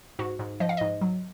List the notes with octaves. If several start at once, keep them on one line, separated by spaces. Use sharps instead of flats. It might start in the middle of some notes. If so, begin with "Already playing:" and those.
G#2 F#4
G#2
F3 D#5
F5
G#2 D#5
F#3